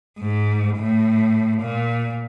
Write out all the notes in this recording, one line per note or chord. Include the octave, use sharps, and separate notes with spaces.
G#2
A2
A#2